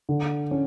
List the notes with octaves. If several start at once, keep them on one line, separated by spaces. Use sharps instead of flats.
D3
C#4